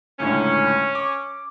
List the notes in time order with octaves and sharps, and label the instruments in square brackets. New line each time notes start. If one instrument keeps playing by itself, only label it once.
[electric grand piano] C#2 A2 D3 [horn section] C#4
[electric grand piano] D6